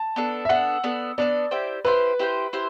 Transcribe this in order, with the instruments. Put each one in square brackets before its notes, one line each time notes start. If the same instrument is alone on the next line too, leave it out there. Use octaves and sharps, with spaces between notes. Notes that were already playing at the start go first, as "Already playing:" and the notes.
Already playing: [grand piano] A5
[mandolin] B3 D4 A4
[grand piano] E5
[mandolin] B3 D4 A4 [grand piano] F#5
[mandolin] B3 D4 A4
[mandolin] B3 D4 A4 [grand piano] D5
[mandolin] E4 G4 C5 G5
[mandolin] E4 G4 C5 G5 [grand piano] B4
[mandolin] E4 G4 C5 G5
E4 G4 C5